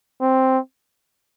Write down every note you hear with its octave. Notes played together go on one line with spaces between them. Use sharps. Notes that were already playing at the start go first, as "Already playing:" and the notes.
C4